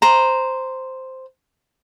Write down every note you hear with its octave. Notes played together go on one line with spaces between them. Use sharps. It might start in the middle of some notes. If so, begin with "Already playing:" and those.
C5 A#5